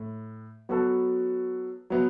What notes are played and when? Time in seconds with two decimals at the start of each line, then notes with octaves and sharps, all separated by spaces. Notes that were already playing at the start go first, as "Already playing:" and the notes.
Already playing: A2
0.69 F#3 B3 F#4 A4
1.90 F#3 B3